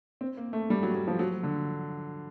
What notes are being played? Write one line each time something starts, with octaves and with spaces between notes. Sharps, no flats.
C4
A#3
A3
G3
F#3
F#3
F3
F#3
D3